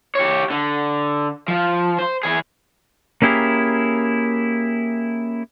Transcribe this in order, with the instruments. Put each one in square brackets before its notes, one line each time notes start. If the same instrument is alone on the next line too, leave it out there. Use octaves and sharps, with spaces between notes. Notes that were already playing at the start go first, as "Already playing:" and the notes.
[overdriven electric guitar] G4 C#5
D3
F3
C5
E3 G#4
[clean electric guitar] A#3 C#4 E4 G4 G#4 A#4